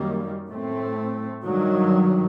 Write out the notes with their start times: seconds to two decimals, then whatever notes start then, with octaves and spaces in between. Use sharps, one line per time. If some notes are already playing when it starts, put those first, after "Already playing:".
Already playing: F#2 D#3 G3 A#3
0.49 A2 A3 C4
1.45 G2 D#3 F#3